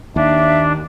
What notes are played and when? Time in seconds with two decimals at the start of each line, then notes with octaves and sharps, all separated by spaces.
0.16 D#2 D4 E5